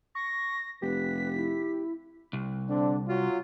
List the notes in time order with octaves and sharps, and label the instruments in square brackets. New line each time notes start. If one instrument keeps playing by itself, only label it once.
[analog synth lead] C#6 [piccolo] A#6
[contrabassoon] F1 [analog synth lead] G4 [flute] B4 [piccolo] B6
[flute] E4
[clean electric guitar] C2
[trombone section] D3 C4 D4
F#3 F4